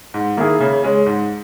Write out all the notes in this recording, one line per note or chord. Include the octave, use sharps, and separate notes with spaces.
G#2
D#3 A#3 E4 G#4
C#3
G#3 C#4
G#2